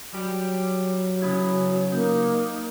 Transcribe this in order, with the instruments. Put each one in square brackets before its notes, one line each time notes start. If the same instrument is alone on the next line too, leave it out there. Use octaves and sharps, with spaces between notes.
[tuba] F#3 [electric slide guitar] G3 G4
[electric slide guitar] C#3 B3 E4
[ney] A#3 [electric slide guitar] D#4